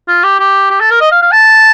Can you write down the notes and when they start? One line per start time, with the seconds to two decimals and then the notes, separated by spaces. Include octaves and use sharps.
0.08 F4
0.23 G4
0.39 G4
0.70 G4
0.80 A4
0.91 A#4
1.01 D#5
1.11 F5
1.22 F5
1.32 A5